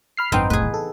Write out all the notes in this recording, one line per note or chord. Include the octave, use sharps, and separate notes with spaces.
B5 F6 C7
G#1 F#2 B3 C4 D#4 G5
F1 F2 A2 G#4 B4
C#3 E3
A4